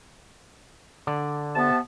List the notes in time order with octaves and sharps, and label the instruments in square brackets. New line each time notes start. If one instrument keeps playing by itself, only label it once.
[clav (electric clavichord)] D3 D5
[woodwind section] C3 B3 A5